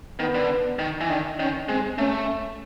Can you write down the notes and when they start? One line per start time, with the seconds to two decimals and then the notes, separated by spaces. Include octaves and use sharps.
0.20 D#3 B3
0.35 D3
0.79 D#3
1.01 E3
1.09 D#3 D4
1.39 D#3 C#4
1.69 G#3 C4
1.98 A3 C#4